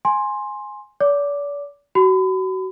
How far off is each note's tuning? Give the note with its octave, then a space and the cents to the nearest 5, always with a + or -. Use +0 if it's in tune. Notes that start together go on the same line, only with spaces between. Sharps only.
G#5 +0 C6 +15
D5 -40 D6 +0
F#4 +30 B5 +35